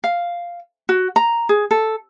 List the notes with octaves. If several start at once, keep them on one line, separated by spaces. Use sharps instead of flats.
F5
F#4
A#5
G#4
A4